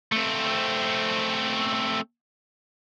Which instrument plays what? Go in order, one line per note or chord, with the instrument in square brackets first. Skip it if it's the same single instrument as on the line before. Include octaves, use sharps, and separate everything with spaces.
[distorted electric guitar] A3 C4